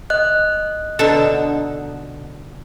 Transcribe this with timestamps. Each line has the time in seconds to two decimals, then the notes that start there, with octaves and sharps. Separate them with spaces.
0.10 D#5 F#6
0.99 B2 D3 D#4 A4